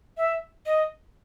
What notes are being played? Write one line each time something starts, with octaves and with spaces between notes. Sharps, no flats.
E5
D#5